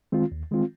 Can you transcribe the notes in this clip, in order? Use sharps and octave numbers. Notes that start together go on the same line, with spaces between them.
D#3 G#3 C4 F4
D#2
D#3 G#3 C4 F4